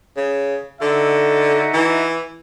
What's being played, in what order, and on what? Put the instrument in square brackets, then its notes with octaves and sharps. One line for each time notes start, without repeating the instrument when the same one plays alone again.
[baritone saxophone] C#3
[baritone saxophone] D3 [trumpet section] D#4 F#4 E5
[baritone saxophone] E3